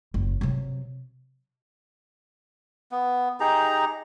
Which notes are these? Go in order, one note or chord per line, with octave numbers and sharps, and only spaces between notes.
F#1
C3 F#3
B3
D#4 G4 G#4 A#5